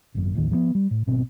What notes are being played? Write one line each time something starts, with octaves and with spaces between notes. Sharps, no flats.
G#1 F#2
A1 D#2 D#3
F3 F#3 B3
G3
A2
G#1 B2 C4